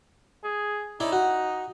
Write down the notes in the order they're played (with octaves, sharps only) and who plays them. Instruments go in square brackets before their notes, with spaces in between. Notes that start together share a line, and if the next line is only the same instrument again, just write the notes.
[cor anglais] G#4
[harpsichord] C#4 E4 D5 [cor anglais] D#4
[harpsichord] F#4